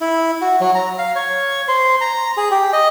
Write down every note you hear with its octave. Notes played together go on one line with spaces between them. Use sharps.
E4
F#4
F#3
A#5
F5
C#5
C5
A#5
G#4
G4
D#5